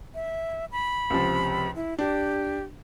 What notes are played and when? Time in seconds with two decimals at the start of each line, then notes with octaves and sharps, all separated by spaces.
0.15 E5
0.72 B5
1.10 C#2 C3 F3
1.76 E4
1.98 D4 G4